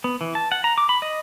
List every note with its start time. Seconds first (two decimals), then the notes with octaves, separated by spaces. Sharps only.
0.04 B3
0.21 E3
0.35 A5
0.52 F#5
0.64 A#5
0.78 D6
0.89 B5
1.02 D#5